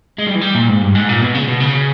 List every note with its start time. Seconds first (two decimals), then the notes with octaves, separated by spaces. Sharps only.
0.19 G#3
0.28 G3
0.35 E3
0.41 G3
0.55 A#2
0.69 G#2
0.81 G2
0.95 G#2
1.09 A#2
1.22 B2
1.35 C#3
1.48 B2
1.61 C#3